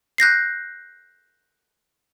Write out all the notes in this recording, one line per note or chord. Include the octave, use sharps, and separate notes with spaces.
F#6 G6 A#6 C7